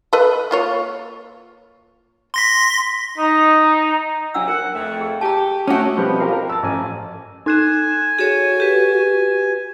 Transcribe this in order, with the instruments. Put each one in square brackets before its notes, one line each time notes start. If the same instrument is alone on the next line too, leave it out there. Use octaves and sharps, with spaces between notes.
[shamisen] A4 B4 D#5
A#3 F4 C#5
[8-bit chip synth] C6 A#6 B6
[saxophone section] D#4
[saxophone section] C3 F#3 [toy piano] D4 F#5 E6
[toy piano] A#4 [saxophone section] F#5
[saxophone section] F2 A3 [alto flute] G5
[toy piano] G#4
[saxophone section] G4 [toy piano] A5 A#5
[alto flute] A3 [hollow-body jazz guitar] C#4 F#4 [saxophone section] G4 D#5
[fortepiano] B2 F3 G3 B3 C4
G4 A#4 F5
A#4
A5 E6
A1 F3 G#5
[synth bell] D#4 F#6 E7 [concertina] G#5
[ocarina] F#4 [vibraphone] G#4 A4 C#5 [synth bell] D#7 E7
[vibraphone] G4 B4